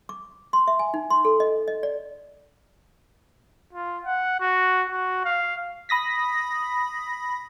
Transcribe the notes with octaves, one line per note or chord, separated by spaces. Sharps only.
D6
C6
E5
G#5
D#4
C6
A4
D#5
D#5
D5
F4
F#5
F#4
F#4
F5
B5 D#6 A#6 B6